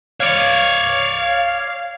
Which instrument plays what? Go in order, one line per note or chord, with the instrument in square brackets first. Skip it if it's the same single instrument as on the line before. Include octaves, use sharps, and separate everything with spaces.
[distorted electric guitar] C#5 D5 [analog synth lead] F5